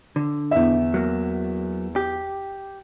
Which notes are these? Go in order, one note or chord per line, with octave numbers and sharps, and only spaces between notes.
D3
E2 E5
F#3 A#3
G4